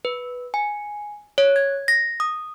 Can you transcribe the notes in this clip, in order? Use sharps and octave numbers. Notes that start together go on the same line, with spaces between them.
B4
G#5
C#5
G#6
A#6
D#6